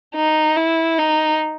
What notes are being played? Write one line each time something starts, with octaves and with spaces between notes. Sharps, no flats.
D#4
E4
D#4